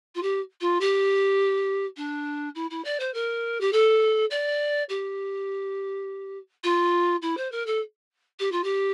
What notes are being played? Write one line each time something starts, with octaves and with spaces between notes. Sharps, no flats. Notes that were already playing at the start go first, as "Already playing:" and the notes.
F4
G4
F4
G4
D4
E4
E4
D5
C5
A#4
G4
A4
D5
G4
F4
E4
C5
A#4
A4
G4
F4
G4